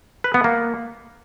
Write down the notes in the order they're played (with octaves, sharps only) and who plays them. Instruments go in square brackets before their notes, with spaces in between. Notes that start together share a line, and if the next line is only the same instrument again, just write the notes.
[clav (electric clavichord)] B4
B3
A#3